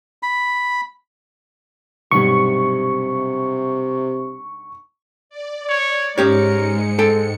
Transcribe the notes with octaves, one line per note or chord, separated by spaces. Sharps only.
B5
B1 G2 C3 C#6
D5
C#5
G#2 G#3 C#4 G4 A#4 C#5 C#7
C4 A4 G5